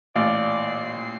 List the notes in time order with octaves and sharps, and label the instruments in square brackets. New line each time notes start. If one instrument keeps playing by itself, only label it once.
[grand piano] A1 [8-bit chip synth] A#2 C7 [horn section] D5 [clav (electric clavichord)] F5